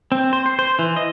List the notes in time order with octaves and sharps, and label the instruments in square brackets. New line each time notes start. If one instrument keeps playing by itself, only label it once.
[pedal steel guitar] C4
C5
C5
C5
E3
D#5